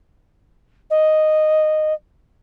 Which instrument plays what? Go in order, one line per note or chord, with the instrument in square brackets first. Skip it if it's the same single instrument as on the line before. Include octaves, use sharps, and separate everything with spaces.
[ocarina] D#5